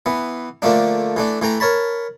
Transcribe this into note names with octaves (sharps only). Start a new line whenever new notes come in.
E3 B3
D3 F3 A3 A#3 D4
E3 A3 D4
E3 A3 G5 A#5
A#4 C#5 A5 B5